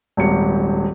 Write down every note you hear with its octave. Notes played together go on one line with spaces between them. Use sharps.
D#1 G#1 C#7